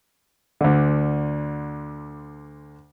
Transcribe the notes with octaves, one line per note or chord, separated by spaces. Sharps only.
D2 D3